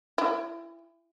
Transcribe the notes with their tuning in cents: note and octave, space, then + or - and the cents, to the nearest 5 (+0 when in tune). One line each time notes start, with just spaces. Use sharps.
E4 +25 G5 +45